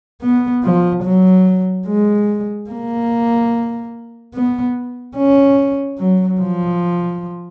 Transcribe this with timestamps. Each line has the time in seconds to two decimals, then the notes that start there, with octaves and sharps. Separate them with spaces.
0.22 B3
0.64 F3
1.04 F#3
1.87 G#3
2.70 A#3
4.34 B3
5.16 C#4
5.99 F#3
6.40 F3